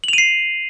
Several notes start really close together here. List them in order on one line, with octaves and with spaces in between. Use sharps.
F#7 F7 D#7 C7